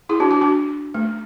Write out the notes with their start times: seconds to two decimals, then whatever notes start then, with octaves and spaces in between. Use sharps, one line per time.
0.09 E4 G#4
0.20 D4 F#4
0.31 D4 F#4
0.41 D4 F#4
0.94 A3